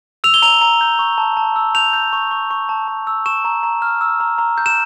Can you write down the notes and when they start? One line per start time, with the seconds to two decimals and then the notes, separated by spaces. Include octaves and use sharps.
0.24 E6 F7
0.34 G7
0.42 A#5 F7
0.62 A#5
0.81 G6
0.99 C#6
1.18 A5
1.37 A5
1.56 E6
1.75 G6 F7
1.93 G6
2.13 C#6
2.31 C#6
2.51 C#6
2.69 A5
2.88 A5
3.07 E6
3.25 C#6 E7
3.45 A#5
3.63 A#5
3.82 F6
4.01 E6
4.20 A#5
4.38 A#5
4.58 G6
4.66 E7